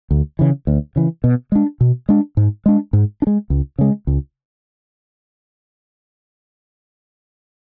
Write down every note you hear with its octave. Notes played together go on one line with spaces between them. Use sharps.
D2
C#3 E3
D2
C#3 E3
B2
G#3 D4
B2
G#3 D4
G#2
G#3 D4
G#2
D4
G#3
C#2
C#3 G#3
C#2